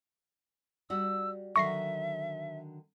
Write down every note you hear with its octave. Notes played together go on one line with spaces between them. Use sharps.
G3 F#4 E6
D3 D#3 F#3 E5 C#6 A#6 C7